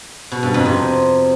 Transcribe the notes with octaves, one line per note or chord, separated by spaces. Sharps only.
B2
G2
F2
C3